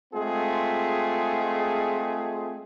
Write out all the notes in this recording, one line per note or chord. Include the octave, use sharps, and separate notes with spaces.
G#3 A3 C4 F4 G#4